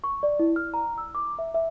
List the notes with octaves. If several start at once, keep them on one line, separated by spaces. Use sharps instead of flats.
C#6
D5
E4
F6
A#5
E6
D6
E5
E5